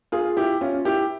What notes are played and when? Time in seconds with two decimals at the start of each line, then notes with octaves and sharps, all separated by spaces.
0.12 F4 G#4
0.37 E4 G4
0.61 C#4 F4
0.85 E4 G4